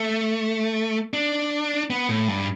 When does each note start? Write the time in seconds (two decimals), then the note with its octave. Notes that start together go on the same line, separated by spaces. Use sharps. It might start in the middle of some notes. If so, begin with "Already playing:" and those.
Already playing: A3
1.13 D4
1.90 B3
2.09 A2
2.28 G2